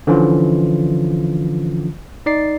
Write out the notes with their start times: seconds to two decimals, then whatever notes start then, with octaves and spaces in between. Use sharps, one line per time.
0.07 D3 E3 F3 C#4 F4
2.26 D#4 D5 A6 C7